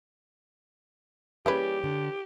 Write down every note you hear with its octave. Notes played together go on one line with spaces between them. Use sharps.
E3 G3 A#3 C#4 G4 G#4 B4
D3